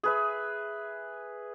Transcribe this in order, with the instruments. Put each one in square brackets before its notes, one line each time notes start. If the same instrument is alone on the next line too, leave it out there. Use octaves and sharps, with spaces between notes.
[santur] G#4 B4 E5